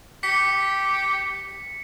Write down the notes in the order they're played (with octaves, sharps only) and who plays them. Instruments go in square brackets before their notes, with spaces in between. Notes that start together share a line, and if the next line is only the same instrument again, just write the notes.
[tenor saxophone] G4 [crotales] B6 C#7